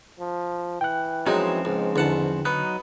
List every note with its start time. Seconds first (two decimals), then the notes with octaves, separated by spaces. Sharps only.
0.20 F3
0.81 E3 G5 F#6
1.26 F3 F#3 G#3 C4 C#4 D#4
1.65 C#2 G#2
1.96 E2 D3 F#5 A5
2.45 F#3 B3 D#4 F#6